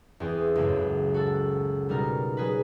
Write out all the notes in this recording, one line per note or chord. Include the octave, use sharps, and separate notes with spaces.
E2 C4 G#4
C#2 F#2 A2
F#4 A4
B2 G3 D#4 A#4
F#3 G#4 B4